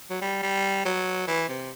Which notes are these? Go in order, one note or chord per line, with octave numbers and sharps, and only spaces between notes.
F#3
G3
G3
F#3
E3
C3